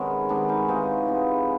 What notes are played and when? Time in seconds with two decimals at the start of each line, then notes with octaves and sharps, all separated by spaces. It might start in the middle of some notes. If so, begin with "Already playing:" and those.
Already playing: C3 D#3 G#3 B3 C#4
0.29 C3 D#3 G#3 B3 D4
0.49 C#4 D#4
0.68 C3 E3 G#3 B3 D#4 F4
1.07 C3 E3 G#3 B3